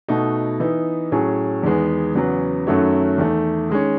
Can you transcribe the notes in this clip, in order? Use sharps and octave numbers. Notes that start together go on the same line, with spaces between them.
B2 A3 D#4 F#4
E3 B3 D#4
A2 F#3 C#4 G#4
E2 D#3 G#3 B3
E2 C#3 F#3 B3
F#2 D#3 F#3 A3 C#4
E2 D#3 A3
D#3 G#3 C#4